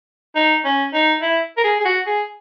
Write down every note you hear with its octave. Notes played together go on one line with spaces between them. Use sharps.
D#4
C#4
D#4
E4
A#4
G#4
G#4
F#4
G#4